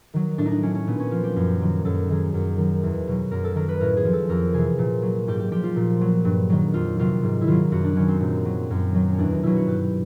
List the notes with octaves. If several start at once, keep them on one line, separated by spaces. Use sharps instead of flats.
D#3 F#3
A2 D4
D#4
D4
F#3 C#4
C#4
A#2 B3
C#4
F3 F4
G4
F#2
D#3 F#3
F#2 A4
D#3 F#3 G#4
F#2
D#3 F#3
E2
B2 F#3
F#2 A#4
A4
D#3 F#3 A#4
B4
A2 A#4
G#4
F3
A4
F2 A#4
C3 E3 G#4
A#2
F#3
G#2 G4
G4
F3 G4
F4
A#2
F#3
G2
D#3 F#3
F2 F4
C3 D#3 F#3 F4
G#2
E4
D#3 F#3 F4
F#2 F#4
D4
D#3 F#3 C#4
C4
A#2 C4
F#3
F#2
D#3 F#3
C#4
E2 D4
D#4
B2 F#3 E4
F#4
G2 G4